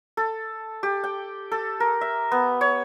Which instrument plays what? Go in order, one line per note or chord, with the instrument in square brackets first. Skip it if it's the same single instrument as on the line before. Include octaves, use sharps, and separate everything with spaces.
[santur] A4
G4
G5
A4
A#4
E5
B3
C#5